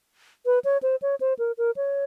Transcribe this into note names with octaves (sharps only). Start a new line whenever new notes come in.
B4
C#5
C5
C#5
C5
A#4
A#4
C#5